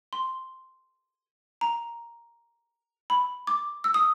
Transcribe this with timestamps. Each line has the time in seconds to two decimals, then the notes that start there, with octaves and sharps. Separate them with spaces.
0.13 C6
1.61 A#5
3.10 B5
3.47 D6
3.84 E6
3.94 D#6